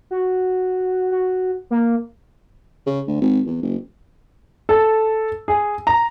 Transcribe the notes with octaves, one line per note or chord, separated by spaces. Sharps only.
F#4
F#4
A#3
C#3
D2
G#1
E2
F#1
A4
G#4
A#5